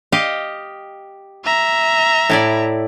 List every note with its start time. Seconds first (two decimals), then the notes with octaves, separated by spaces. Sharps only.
0.12 G4 D#5 F5
1.44 E5 A#5
2.30 A2 E4 D5